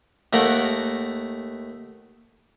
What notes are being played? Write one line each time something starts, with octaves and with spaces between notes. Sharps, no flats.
D#2 A3 A#4 F5 F#5